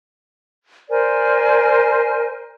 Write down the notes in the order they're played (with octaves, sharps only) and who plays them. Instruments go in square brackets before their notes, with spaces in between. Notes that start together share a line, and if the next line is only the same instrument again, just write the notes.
[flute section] A#4 C5 D5 G#5